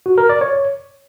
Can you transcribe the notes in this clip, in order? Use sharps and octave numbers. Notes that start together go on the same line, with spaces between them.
F#4
A#4
D5
C#5